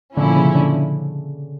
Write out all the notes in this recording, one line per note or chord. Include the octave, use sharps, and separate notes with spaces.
A#2 D3 F3 C#4 E4
C#3
D3
D3